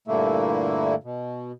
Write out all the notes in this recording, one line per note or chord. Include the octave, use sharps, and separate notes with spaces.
G2 A#2 D3 A3 A#3 E4
B2